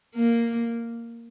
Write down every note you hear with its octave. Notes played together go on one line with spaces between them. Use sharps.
A#3